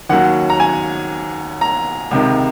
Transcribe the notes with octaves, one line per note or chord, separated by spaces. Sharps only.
D#2 D#3 F#3 C#4 F#5
A#5
G#5
A#5
C#2 C3 D#3